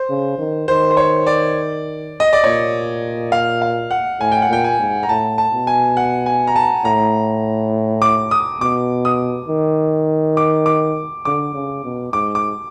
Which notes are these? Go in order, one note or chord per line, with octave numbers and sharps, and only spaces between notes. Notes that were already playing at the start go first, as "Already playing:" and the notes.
Already playing: C5
C#3
D#3
D#3 C5
C5
C#5
D5
D#5
D5
A#2 C#5
F5
F5
F#5
A2 G#5
G5
F#5
A#2 G5
G#5
G#2
A#5
A2 A5
A5
B2
G#5
F#5
G#5
A#5
A5
A2 A#5
D6
D#6
B2 D6
D#6
D#3
D6
D6
D3 D6
C#3
B2
G#2 D6
D6